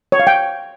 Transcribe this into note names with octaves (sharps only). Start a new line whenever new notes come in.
C#5
F5
G5